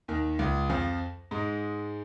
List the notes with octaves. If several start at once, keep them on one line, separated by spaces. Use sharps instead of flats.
D#2 D#3
C#2 C#3
F2 F3
G#2 G#3